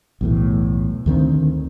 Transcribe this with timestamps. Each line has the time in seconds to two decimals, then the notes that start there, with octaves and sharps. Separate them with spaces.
0.21 B1 E2 A2
1.06 D2 D#3 F#3 C4